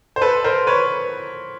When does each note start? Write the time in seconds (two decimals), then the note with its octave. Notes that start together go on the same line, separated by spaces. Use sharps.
0.16 C5
0.22 A4 B4
0.44 A#4 C5
0.67 B4 C#5